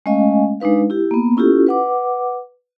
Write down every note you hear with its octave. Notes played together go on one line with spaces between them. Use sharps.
G#3 A3 C#4 D#5 F5 G#5
G#3 D4 D#4 B4 F5
E4 G4
A#3 B3
C#4 E4 F4 G4 A4
B4 F#5 D6